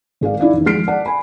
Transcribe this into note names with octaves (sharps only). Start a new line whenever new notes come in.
G#1 G#4 D5 F5
D#4 E4 D5 F5
E2 D#3
F3 G#3 F6 B6 C7 D7
D5 F#5 A5
G#5 B5